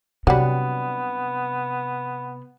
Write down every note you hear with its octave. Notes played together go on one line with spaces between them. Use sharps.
C3 F#3 G3 B3 D4 F#5